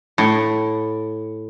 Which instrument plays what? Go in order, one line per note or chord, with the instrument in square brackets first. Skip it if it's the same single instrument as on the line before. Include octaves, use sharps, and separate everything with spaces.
[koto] A2